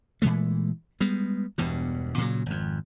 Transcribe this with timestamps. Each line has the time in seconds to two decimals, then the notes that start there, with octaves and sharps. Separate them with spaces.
0.22 A#2 E3 G#3 A3
1.01 G3 G#3 B3
1.58 E1 E2 G2 B2
2.18 A#2 C#3 F3 F#3
2.46 G#1 F2